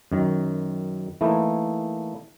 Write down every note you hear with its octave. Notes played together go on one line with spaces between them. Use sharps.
F#2 D#3
E3 A3 A#3 D#4 E4